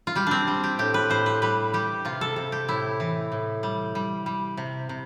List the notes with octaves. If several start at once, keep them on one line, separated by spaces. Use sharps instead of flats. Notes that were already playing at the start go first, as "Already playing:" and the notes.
F4
G3 G4
C4 D4
G3
G4
A2 G4
B4
A2 C5
B4
G3 B4
G3 G4
C3 F4
A4
C3 A4
G4
A2 E4
E3
A2
G3
G3
G3
C3
C3